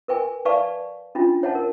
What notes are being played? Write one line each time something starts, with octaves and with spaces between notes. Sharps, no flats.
A#4 B4 G5 G#5
B4 D5 F5 A5 C#6
C#4 D4 F4 F#4
C#5 F#5 A5
A#4